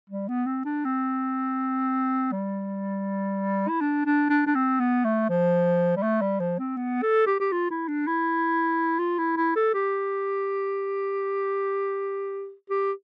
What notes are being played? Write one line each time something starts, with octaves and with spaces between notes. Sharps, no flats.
G3
B3
C4
D4
C4
G3
E4
D4
D4
D4
D4
C4
B3
A3
F3
G3
A3
G3
F3
C4
B3
A4
G4
G4
F4
E4
D4
E4
F4
E4
E4
A4
G4
G4